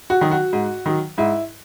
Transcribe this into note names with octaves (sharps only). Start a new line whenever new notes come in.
F#4
D#3 F#3
F#4
G#2
D#3 F#3
G#2 E4